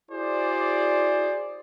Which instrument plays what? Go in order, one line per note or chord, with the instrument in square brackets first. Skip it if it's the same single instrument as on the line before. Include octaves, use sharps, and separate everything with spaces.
[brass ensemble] E4 F#4 G#4 C5 D5